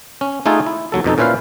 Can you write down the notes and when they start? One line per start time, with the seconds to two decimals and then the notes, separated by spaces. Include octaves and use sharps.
0.21 C#4
0.46 A3 D#4 F4 G#4 A4
0.67 E4
0.92 D#2 F#3 A4
1.04 F2 B2 D#4 A4
1.18 A#2 C#4 E4 B4 C5 F5